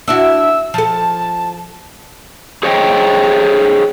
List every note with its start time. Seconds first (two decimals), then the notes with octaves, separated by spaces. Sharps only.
0.08 D4 E4 F#4 E6
0.74 F3 A4 A5
2.63 G#4 C5 C#5 D#5 F5 G5